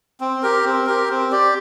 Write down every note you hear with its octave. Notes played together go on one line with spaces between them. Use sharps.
C4
G4 A#4
C4
G4 A#4
C4
G4 D5